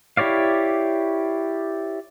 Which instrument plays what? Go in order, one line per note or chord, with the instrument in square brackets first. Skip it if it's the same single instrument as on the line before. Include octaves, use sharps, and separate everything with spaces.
[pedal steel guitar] E4 G4 C#5 D5 F5